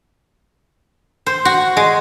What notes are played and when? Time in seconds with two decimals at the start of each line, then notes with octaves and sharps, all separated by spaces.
1.26 C5
1.45 F#4
1.77 G#3